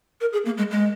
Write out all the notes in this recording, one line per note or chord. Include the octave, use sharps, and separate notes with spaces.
A#4
G#4
A#3
G#3
G#3